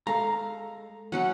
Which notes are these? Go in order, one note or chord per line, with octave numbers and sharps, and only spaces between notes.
G#3 A4 F5 A#5
F#3 C#4 F#4 F#5